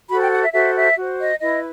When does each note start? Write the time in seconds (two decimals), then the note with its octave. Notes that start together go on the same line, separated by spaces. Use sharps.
0.09 F#4 A4 C5 B5
0.21 G5
0.31 F#5
0.42 E5
0.52 F#4 A4 C5 E5
0.75 E5
0.97 F#4 C5
1.18 D#5
1.39 E4 B4 D#5